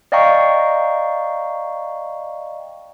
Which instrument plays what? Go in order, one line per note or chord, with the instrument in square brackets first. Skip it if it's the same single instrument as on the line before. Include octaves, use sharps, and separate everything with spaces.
[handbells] D5 D#5 F5 G5 A#5 C#6